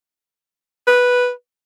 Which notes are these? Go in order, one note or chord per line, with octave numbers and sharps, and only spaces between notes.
B4